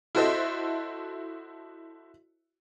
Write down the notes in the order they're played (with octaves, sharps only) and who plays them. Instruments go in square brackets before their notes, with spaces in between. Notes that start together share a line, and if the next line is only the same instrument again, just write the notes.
[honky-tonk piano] E4 F#4 A4 C5 D#5 E5